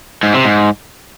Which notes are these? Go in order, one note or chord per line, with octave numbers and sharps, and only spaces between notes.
G#2
C3
G#2